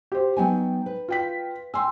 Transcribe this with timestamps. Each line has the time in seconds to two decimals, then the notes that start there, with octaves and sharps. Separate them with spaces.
0.12 G4 C5
0.37 F#3 B3 D#4 G5 G#5
0.86 B4
1.08 F4 G5 B6
1.74 G5 G#5 C6 E6